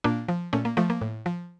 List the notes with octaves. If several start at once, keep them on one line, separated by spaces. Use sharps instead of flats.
A#2 A#3 D4
F3
A#2 A3 C#4
A#3
F3 A3
A#3
A2
F3